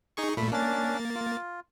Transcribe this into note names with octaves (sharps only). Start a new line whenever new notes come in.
D#4 G#4 C#6
A#2 A3 B5
A#3 C#4 D4 A6
F4